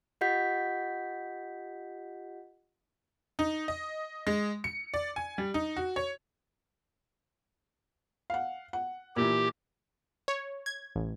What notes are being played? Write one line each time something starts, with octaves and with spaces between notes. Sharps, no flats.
F4 G4 D#5 F#5 G6 B6
D#4
D#5
G#3
C#7
D5
G#5
G3
D#4
F#4
C#5
F5 F#5
F#5
A#2 E3 G4
C#5
G#6
A1